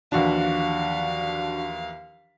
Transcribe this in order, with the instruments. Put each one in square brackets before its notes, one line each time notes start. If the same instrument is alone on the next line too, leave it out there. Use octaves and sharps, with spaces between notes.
[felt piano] D#2 E3 F3 [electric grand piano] D4 F#4 [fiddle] F5